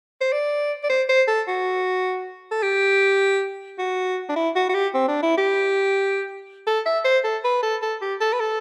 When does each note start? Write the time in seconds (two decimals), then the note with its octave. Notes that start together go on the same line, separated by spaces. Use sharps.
0.21 C5
0.32 D5
0.83 D5
0.89 C5
1.09 C5
1.27 A4
1.48 F#4
2.51 A4
2.62 G4
3.78 F#4
4.29 D4
4.36 E4
4.55 F#4
4.69 F#4
4.74 G4
4.94 C4
5.08 D4
5.22 E4
5.37 G4
6.67 A4
6.85 E5
7.04 C5
7.24 A4
7.44 B4
7.62 A4
7.82 A4
8.01 G4
8.21 A4
8.33 B4
8.40 A4